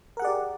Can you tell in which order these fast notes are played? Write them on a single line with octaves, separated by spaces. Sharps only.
A#4 F#5 G#4 D5 G4